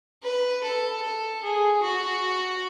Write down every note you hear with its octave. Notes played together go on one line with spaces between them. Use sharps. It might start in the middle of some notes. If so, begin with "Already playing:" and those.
B4
A4
A4
G#4
F#4